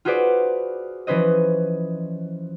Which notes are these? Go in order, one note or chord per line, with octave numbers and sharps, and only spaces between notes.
F4 F#4 G#4 B4 C5 D5
E3 F3 C#4 B4 C5 D#5